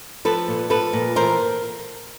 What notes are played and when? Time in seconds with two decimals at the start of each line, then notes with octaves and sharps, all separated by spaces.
0.25 F3 A4 B4
0.48 A#2
0.70 F3 A4 B4
0.93 A#2
1.16 E3 A#4 C5